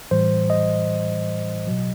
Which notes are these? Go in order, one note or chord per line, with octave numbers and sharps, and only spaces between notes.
A2 E3 G3 C5
D#5
B2 F#3